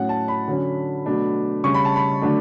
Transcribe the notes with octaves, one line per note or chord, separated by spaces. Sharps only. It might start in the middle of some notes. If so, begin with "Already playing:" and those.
Already playing: A2 F#3 C#4 F#5
A5
B5
D3 F#3 C#4
B2 F#3 A3 D4
C#3 G3 C#4 C#6
B5
A5
B5
D3 F#3 A3 D4